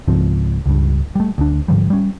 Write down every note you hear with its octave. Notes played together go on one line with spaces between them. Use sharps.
C#2 G#2 F3 C4
C#2 G2
G3 A3
D2 D4
G#2 D3 F3 G3
G3 C#4